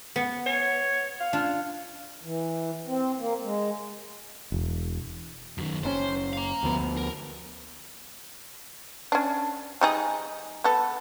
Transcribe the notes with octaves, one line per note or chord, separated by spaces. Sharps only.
B3
C#5
F5
D4 F4
E3
C4
A#3
G#3
E1
F#2 D#3
F#1 A#2 C#4 C5
F5 A#5
D2 F3 B3
A#4
C#4 D4
G3 D#4 G#4
B3 A4